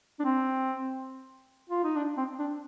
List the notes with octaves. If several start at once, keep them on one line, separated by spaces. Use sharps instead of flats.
D4
C4
F4
D#4
D4
C4
D4